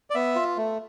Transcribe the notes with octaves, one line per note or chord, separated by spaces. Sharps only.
D5
B3 E5
F4
A3